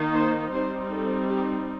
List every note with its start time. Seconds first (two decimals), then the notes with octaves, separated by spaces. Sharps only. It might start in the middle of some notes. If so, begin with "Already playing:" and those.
Already playing: D#3 A#3 D#4
0.15 C5
0.52 G3 C4 D#4 C5
0.91 A4
1.28 G4